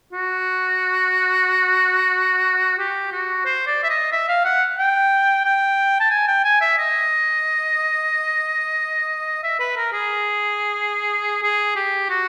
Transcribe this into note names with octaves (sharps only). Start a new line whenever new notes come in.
F#4
G4
F#4
C5
D5
E5
D#5
E5
F5
F#5
G5
G5
A5
G#5
G5
G#5
E5
D#5
E5
B4
A#4
G#4
G#4
G4
F#4